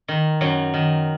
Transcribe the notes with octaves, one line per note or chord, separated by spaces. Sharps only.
D#3
F#2 F#3
D#3